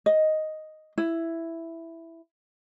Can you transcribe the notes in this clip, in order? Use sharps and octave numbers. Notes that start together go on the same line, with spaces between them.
D#5
E4